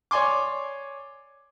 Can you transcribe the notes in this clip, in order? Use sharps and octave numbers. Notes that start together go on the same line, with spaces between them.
C#5 D5 G#5 C6 D6